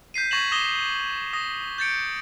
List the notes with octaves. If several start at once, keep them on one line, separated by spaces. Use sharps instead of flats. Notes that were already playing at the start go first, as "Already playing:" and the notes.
G6 B6 C7 D#7
C#6 G#6 A#6 B6 E7 F#7
D6 D#6 A#6 E7 G7
D#6 A#6
G6 A6 C#7 D7